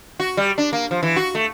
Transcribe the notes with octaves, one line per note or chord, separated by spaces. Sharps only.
F#4
G3
D4
A#3
F3
E3
F#4
A3